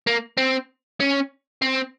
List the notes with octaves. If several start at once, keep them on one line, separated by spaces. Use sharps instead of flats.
A#3
C4
C#4
C4